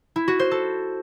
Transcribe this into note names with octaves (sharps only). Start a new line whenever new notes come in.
E4
F#4
C5
A4